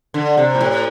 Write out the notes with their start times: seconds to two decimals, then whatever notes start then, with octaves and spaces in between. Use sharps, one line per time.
0.14 D3
0.37 C3
0.55 A#2
0.61 A2